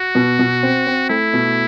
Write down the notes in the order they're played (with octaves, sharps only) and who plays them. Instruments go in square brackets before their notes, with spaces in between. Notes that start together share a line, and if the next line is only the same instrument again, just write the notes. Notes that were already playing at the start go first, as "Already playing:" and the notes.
Already playing: [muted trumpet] F#4
[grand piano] B2
B2
C4
C4
[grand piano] A3 [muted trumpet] E4
[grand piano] B2